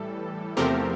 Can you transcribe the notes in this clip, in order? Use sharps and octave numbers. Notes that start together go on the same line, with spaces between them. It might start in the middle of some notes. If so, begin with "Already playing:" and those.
Already playing: A2 E3 G3 A4
E2 C3 F3 A3 C4 G4 A#4